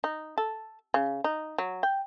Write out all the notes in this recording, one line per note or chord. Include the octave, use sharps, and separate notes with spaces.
D#4
A4
C#3
D#4
F#3
G5